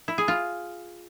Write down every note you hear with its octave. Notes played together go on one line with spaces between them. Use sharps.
E4
G#4
F4